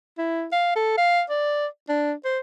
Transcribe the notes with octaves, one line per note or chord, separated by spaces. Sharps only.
E4
F5
A4
F5
D5
D4
C5